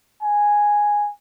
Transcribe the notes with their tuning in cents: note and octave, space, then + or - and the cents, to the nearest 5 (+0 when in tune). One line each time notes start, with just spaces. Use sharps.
G#5 -5